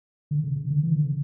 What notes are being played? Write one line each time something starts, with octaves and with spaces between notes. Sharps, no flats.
D3
C#3
C#3
D3
E3
D3
C#3